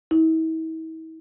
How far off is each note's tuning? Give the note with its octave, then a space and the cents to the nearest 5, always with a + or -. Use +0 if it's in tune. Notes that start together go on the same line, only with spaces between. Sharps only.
E4 -45